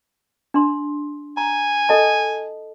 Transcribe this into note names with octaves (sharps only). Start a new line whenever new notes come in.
D4 C6
G#5 A#5
A4 D#5 A5